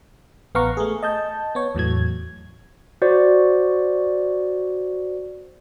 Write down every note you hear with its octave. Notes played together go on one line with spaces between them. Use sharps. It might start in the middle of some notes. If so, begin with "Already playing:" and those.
A1 B3 F5 F#5 A#5 C#6
A3 G#4
D#5 A5 G6
B3 C#5
E2 A2 F#3 G#6
F#4 C5 D5